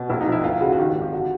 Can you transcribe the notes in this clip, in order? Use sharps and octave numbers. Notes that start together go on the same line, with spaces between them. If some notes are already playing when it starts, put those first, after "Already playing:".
Already playing: B2
A#1 E4
D#4
F3 E4
D2 F4
C#3 F#4
F#4
D#3 G4
F4
G#1
G4
D3 F#4